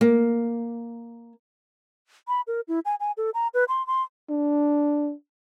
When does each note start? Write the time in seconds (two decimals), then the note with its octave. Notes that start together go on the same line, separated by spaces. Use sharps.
0.01 A#3
2.28 B5
2.47 A#4
2.68 E4
2.85 G#5
3.00 G#5
3.17 A4
3.34 A#5
3.54 B4
3.68 C6
3.87 C6
4.29 D4